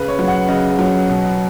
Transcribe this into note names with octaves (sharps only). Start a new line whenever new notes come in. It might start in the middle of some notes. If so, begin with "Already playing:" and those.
Already playing: C#3 B4
C#5
F#3
F#5
C#3 D#5
F#3
B2